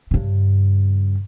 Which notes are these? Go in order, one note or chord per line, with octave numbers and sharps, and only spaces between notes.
G2 C#3